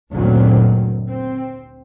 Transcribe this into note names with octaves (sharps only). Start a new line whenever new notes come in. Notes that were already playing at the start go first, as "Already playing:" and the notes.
F#1 D2 A#2 D#3 F#3 C4
C4